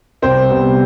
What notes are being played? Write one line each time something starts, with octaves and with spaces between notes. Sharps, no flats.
C2 C4 C5
C3 G3 B3